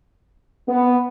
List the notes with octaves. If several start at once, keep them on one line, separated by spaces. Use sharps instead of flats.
B3